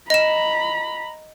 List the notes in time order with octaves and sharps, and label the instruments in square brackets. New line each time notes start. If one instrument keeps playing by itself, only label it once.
[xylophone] D#5 E7 [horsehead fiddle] A#5 B5